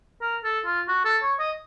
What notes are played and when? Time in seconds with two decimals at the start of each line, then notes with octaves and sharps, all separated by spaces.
0.21 A#4
0.44 A4
0.65 F4
0.88 F#4
1.05 A4
1.23 C#5
1.39 D#5